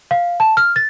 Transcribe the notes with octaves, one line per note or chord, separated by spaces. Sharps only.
F5
A5
F6
A6